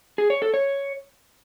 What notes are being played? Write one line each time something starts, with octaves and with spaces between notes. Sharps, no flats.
G#4
C#5
A4
C#5